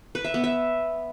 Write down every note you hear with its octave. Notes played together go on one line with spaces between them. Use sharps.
B4
E5
B3
E5